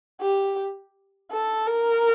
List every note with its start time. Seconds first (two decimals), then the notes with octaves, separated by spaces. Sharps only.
0.20 G4
1.31 A4
1.67 A#4